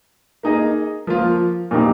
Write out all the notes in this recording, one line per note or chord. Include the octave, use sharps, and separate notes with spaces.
A#3 D#4 G#4 D#5
F3 A#3 F4
A#2 F3 A#3 D#4 G4